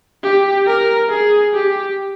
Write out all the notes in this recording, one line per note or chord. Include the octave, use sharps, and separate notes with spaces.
G4
A#4
G#4
G4